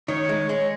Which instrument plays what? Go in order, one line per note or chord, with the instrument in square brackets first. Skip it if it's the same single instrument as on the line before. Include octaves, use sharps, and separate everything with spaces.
[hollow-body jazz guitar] D#3 [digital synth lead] C#5
[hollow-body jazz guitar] G#3
G#3